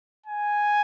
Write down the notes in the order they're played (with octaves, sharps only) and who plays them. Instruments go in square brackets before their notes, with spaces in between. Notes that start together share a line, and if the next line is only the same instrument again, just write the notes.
[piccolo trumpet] G#5